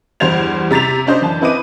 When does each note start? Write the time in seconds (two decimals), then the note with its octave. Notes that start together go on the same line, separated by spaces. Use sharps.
0.20 E2 G2 C5 G#6 F7
0.71 C3 A#5 A6 B6 F7
1.07 C#4 D4 C5 D#5 G6
1.21 F#1 E3 A5
1.41 C4 E4 B4 D#5 D6 D#7